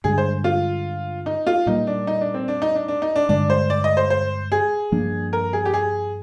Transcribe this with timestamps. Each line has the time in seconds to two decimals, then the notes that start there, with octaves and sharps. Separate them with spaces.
0.04 G2 D3 G#3 G#4
0.18 C5
0.44 F4
1.26 D#4
1.47 F4
1.66 A#2 G3 A#3 D#4
1.87 D4
2.07 D#4
2.21 D4
2.34 C4
2.48 D4
2.62 D#4
2.75 D4
2.88 D4
3.02 D#4
3.16 D4
3.29 G2 D3 G#3 D4
3.50 C5
3.70 D5
3.84 D#5
3.97 C5
4.10 C5
4.52 G#4
4.92 G2 F3 A#3 D4
5.33 A#4
5.53 G#4
5.65 G4
5.74 G#4